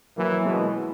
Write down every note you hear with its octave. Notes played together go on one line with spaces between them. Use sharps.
E3 F#3 A#3
B2 E3 G#3